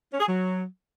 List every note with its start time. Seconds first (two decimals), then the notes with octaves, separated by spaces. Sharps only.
0.13 C#4
0.20 G#4
0.28 F#3